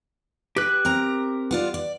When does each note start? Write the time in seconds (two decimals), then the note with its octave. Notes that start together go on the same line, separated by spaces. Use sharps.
0.56 G4 B4 F#6
0.85 C4 A#4 A#5
1.51 B3 F4 D5
1.74 D5